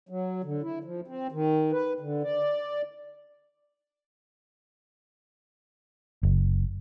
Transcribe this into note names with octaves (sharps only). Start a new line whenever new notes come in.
F#3
D3
E4
F3
C4
D#3
B4
D3
D5
F#1